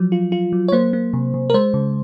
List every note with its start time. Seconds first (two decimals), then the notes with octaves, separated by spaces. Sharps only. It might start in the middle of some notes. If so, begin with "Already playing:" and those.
Already playing: F3 F#3
0.12 F4
0.32 F4
0.53 F#3
0.68 C#5
0.72 A#3 C5
0.93 A#3
1.13 C3
1.34 C3
1.50 A#4
1.54 G#3 C5
1.74 C#3